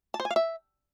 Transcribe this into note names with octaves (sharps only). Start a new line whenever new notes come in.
A5
C5
G#5
F5
E5